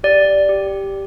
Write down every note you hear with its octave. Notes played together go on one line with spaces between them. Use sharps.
G4 D5
G4